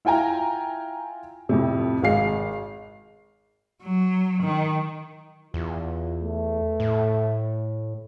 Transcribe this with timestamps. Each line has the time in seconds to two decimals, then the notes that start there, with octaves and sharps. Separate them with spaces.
0.05 E4 F4 G5 G#5 A#5
1.49 F2 A2 C3
2.02 G#1 G#3 F5 C7
3.82 F#3
4.43 D#3
5.54 E2 F4
6.24 A3
6.80 A2